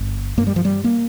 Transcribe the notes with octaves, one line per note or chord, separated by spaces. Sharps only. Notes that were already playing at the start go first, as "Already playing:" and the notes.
Already playing: G1
G2 A#3
G3
F3
G3
A#3